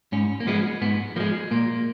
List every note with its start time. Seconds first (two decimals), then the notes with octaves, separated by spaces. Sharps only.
0.12 G#2 C#4
0.40 A#3
0.47 F3 G#3 B3
0.82 G#2 B3
1.16 F3 G#3 A#3
1.51 A#2 A#3